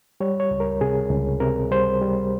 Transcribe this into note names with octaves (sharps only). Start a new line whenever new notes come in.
G3 C#5
C#5
C#2
A#4
C3 G#4
C#2
C3 A#4
G3 C5
G3